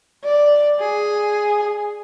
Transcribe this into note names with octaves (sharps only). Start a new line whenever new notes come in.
D5
G#4